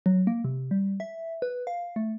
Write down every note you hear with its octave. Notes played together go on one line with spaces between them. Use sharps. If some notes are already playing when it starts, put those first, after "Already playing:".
F#3
A#3
C3
G3
E5
B4
F5
A3